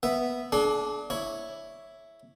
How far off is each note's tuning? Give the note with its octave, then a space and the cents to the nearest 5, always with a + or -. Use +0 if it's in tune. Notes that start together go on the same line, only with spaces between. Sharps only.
B3 +0 E5 +0
D4 -5 G#4 +45 C6 +25
E4 +0 C#5 +0